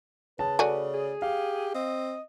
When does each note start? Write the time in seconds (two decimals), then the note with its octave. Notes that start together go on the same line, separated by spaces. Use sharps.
0.39 C#3 B4 A5
0.59 A3 F#4 D5 G#5
0.94 G#4
1.22 G4 F5
1.75 C4 D#5